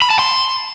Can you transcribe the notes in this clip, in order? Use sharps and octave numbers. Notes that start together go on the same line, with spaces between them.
B5
A5
C6